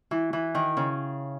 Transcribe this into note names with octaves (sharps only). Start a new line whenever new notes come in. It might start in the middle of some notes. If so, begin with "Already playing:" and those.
E3
E3
D#3
C#3